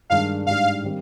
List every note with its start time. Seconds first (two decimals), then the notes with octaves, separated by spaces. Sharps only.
0.10 G2 D#3 G#3 D4 F5
0.46 G#2 G3 D4 F5
0.84 D#3 G3 C4